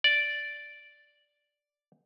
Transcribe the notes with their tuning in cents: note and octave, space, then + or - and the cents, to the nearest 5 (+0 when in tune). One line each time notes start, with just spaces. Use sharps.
D5 -5